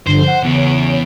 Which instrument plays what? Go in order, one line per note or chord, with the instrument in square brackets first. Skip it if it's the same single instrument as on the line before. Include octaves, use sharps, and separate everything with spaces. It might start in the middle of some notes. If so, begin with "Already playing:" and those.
[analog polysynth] G2 D3 F3 [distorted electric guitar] C5
[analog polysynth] F#5
[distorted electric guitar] E2 [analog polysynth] C#3 C#5 D7